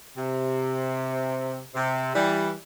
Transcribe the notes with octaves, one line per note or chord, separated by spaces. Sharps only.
C3
C3
E3 G3